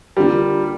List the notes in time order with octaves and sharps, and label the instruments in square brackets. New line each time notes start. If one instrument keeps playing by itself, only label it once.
[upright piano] D3 A#3 F4 A#4 [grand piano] G3